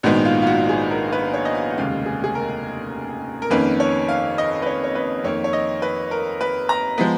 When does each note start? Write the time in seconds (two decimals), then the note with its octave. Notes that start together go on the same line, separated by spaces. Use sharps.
0.03 A#1 G#2 D#3 G#3 B3 F#4
0.25 F4
0.42 F4
0.47 F#4
0.69 G#4
0.91 A#4
1.12 B4
1.34 C#5
1.45 D#5
1.55 F5
1.70 F#5
1.77 F1 D#2 C#3 G#3 F5
2.06 G#4
2.24 G#4
2.35 A#4
3.42 A#4
3.50 F2 D#3 A#3 C#4 B4
3.80 C#5
4.09 F5
4.38 D#5
4.62 B4
4.66 C#5
4.84 C#5
4.95 B4
5.24 F2 D#3 A#3 C#5
5.44 C#5
5.53 D#5
5.82 B4
6.11 A#4
6.41 B4
6.69 A#5
6.98 F3 G#3 B3